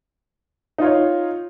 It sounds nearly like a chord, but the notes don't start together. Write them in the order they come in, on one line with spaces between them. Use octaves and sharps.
D#4 F4 C#5